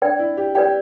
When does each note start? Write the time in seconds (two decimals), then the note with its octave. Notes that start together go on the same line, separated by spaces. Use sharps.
0.02 D4 B4 D5 G5
0.19 E4
0.37 G4
0.55 G4 B4 D5 G5